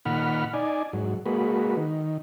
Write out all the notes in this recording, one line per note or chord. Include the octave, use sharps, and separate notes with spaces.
A#2 D#3 F#5 B5 F6
D#4 D5 G#5
G#2 F#3
G#3 A#3 F#4 B4
D#3